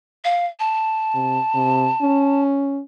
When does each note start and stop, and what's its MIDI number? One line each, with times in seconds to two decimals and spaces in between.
0.24 0.46 77
0.59 2.42 81
1.14 1.38 48
1.54 1.88 48
2.02 2.81 61